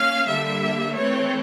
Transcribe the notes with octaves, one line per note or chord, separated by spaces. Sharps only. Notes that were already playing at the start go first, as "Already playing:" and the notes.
Already playing: A#3 C#4 F5
D3 G3 A#3 E5
E3 A3 C4 C#5